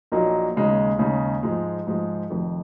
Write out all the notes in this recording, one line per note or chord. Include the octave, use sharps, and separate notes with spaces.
A#1 A#2 F#3 A#3 D#4
D#2 C#3 G#3 D#4
D#2 C#3 G#3 D#4
G#2 F3 G#3
G#2 F3 G#3
F1 F2 D#3